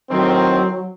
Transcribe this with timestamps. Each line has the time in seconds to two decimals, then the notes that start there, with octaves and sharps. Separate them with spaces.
0.10 A2 D#3 F#3 C4